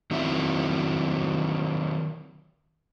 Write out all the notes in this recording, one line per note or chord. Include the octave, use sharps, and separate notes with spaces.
D#3 F#3 C4 E4 E5